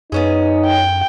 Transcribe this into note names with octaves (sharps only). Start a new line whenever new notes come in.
F#2 B3 C#4 D#4 G#4
G5